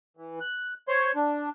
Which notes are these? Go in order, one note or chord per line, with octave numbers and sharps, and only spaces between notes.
E3
F#6
C5 C#5 C6
D4